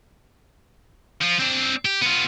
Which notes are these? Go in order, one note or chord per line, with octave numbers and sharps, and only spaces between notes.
F3 F4
C4 D4
G4
B3 F4